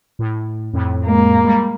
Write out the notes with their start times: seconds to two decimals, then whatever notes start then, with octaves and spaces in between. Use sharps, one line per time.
0.19 A2
0.73 F2 A2
1.06 G#3 A#3
1.44 G3